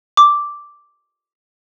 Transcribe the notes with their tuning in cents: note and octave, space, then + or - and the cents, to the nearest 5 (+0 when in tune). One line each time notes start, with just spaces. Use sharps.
D6 -5